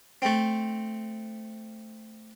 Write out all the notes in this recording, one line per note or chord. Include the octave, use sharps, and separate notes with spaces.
A3 C4